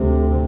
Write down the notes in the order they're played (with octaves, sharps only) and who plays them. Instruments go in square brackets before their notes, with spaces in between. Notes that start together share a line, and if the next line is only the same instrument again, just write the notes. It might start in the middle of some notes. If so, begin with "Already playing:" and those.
Already playing: [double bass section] D2 C3